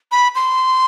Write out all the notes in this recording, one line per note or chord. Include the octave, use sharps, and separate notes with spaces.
B5
C6